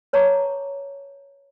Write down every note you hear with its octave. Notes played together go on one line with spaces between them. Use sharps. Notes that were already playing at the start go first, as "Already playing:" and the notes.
B4 C#5 A5 A#5 C#6 D6